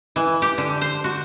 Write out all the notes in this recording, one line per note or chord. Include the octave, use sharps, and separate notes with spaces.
E3
G4
D3
C5
F#4